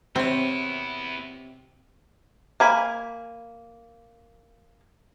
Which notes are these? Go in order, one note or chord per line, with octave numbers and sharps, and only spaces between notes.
C3 B3 C4 E4 C#5
A#3 G#5 B5